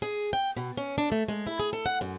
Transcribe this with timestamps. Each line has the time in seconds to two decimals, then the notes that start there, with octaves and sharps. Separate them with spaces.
0.02 G#4
0.33 G5
0.57 B2
0.77 C#4
0.98 D4
1.12 A3
1.28 G#3
1.47 E4
1.60 G#4
1.73 A4
1.86 F#5
2.01 F#2